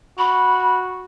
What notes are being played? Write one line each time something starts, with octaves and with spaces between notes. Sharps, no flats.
F#4 B5